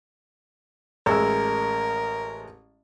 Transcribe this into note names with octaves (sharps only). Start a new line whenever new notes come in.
A1 G#3 A#4 E6